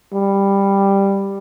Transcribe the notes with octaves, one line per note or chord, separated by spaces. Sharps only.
G3